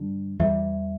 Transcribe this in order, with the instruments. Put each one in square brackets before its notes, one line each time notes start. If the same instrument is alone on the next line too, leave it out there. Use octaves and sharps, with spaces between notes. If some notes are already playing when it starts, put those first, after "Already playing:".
Already playing: [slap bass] G2 D3 G3 D4
[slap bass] E2 E3 G3 [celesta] E5